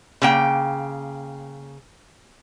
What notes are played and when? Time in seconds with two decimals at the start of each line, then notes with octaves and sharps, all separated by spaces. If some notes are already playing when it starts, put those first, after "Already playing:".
0.22 C#3 A#3 G5